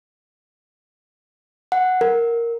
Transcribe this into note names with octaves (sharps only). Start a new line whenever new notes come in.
F#5
A#4